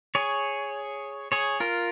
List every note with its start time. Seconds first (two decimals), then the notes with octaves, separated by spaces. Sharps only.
0.15 G#4 C#5
1.32 G#4 C#5
1.60 F4 A#4